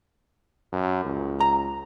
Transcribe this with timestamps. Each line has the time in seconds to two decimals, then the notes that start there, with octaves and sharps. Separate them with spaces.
0.73 F#2
1.05 C#2
1.40 A#5